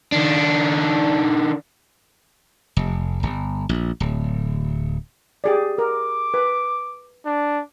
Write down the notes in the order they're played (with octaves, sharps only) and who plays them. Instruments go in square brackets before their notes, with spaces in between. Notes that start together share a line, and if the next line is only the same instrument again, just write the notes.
[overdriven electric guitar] D#3 D4
[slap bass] F1
G1
A#1
D1
[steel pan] G4 G#4 D5
[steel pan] A#4 [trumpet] D6
[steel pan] B4
[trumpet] D4